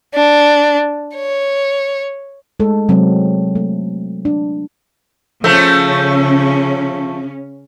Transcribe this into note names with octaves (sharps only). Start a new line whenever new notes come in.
D4
C#5
G#3 A3 A4
C3 F#3 G#3 C4
A3
D4
C#3 F3 A3 C#4